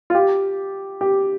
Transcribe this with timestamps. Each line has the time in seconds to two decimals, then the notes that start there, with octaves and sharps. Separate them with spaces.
0.10 F4
0.15 G4
1.01 G4